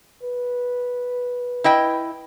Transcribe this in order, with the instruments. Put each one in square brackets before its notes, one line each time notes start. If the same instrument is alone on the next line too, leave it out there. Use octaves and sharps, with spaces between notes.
[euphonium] B4
[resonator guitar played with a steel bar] E4 D#5 G5